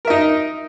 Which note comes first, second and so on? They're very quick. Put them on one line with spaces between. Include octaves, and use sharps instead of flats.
A#4 E5 D#4